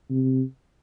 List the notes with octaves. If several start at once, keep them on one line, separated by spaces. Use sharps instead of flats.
C3